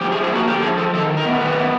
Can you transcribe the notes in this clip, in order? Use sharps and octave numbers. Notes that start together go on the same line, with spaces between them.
F3 G4
G#4
F3
G#4
A#3 F#4
D3 G4
F3 G#4
F3 A4
D#3 A4
D#3
A#4
B3
D#3 B4
B3